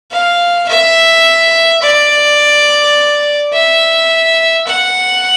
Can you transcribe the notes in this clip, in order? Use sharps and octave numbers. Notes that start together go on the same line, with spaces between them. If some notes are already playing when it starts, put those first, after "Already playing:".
F5
E5
D5
E5
F#5